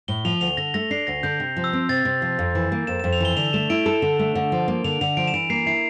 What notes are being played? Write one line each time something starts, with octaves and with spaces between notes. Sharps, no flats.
A2 G7
F3 F7
D2 F7
D3 A#6
A3 A#6
D4 C7
D2 A#6
D3 G6
C3
F3
E6
C4
C3 A6
C3
F3
F2
E3
A#3
F2 E7
F2 E7
F7
E3 G7
D3 F7
A3 E7
E4 D7
A4
D3
A3
D3
F3
A#3
D3 F7
D3 F7
F3 D7
E7
E3 D7
A#3 C7
E4 C7